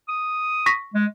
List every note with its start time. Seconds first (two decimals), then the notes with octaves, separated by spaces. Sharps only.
0.08 D#6
0.66 C#6 A#6 B6
0.94 G#3